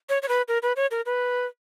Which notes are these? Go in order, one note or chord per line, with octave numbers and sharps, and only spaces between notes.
C#5
C#5
B4
A#4
B4
C#5
A#4
B4